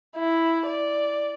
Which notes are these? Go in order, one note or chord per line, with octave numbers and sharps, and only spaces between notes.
E4
D5